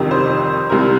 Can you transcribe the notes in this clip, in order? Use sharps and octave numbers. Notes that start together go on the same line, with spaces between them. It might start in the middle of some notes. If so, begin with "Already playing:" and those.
Already playing: G1 F2 C3 D#3 G3
C5
C2 C3 G3 A#4